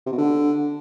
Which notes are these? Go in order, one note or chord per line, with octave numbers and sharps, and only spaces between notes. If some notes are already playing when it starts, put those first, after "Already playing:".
C3
B2
D3